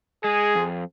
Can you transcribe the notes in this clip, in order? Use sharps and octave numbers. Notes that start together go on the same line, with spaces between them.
G#3 G#4
F2